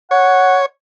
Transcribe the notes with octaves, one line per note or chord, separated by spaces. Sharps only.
C#5 F#5